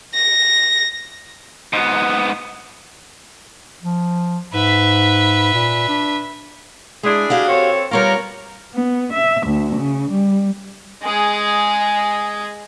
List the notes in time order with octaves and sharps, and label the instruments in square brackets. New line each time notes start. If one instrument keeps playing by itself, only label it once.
[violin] A#6
[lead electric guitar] G#2 B3
[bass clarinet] F3
[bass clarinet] G#2 [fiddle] B4 E5
[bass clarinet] A#2
D4
[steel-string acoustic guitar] G#3 [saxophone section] D4 E4 G#4
[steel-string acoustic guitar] F#4 G4 F5
[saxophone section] C4 A4 C#5
[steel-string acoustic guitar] G3 B3 F4 [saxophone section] A#4 C#5
[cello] B3
E5
D2
C#3
G3
[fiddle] G#3 G#4